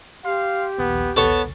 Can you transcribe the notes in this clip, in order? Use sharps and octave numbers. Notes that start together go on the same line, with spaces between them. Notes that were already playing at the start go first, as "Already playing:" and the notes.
G4 F5 C6
A#1 D#2 B3
B3 A4 C#5 A5